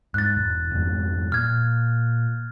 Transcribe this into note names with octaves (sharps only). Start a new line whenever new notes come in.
G#2 F#6 A6
E1
F2 G#2 B2
A#2 F6 G#6